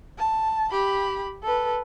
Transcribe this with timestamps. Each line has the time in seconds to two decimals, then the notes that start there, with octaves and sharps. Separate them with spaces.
0.18 A5
0.72 G4 B5
1.43 A4 B4